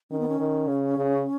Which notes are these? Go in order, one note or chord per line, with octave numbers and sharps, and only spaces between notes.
D#3 C#4
B3
C#4
D#3
C#3
C#3